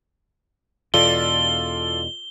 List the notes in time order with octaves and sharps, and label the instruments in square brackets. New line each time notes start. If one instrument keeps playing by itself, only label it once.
[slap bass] E2 B2 [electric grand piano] F4 A4 D5 [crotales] G7